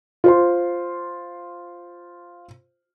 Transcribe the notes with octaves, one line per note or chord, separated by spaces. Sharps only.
F4 C5 C6